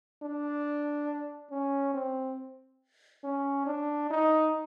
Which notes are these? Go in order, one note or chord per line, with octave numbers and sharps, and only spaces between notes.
D4
C#4
C4
C#4
D4
D#4